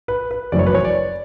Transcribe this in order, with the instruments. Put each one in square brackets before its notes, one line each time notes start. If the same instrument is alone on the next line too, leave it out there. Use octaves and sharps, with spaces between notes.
[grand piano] B4
B4
F#1 F#2 E3 A3 C#4 D5
C#5
B4
C#5
D5